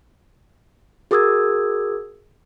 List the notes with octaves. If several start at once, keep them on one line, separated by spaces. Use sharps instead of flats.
F#4 G#4 A#4 D#6 E6 G#6